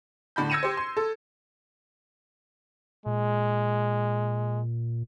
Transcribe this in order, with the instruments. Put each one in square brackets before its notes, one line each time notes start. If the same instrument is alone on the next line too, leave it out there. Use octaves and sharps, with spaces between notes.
[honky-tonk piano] A2 D3 B5 G6
E6 G#6 A#6 C#7 D#7 E7
G4 C5
C6
A4
[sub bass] A#2 [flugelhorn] G#3